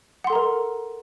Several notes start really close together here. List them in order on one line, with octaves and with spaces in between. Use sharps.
F#5 C6 A4 A#5 A#4